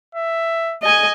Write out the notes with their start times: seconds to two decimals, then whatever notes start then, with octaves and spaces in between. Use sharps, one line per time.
0.15 E5
0.83 D#5 G#5